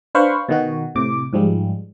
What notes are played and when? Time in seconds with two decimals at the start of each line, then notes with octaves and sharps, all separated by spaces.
0.15 D4 B4 C5 F5 B5 C#6
0.49 B2 D#3 F#4
0.95 A2 C3 D6
1.33 G#2 F3 G3 G#3